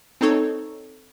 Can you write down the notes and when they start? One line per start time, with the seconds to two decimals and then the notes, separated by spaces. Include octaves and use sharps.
0.21 C4 D#4 A4 C#5